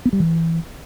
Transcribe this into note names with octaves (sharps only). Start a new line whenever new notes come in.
B3
G3
E3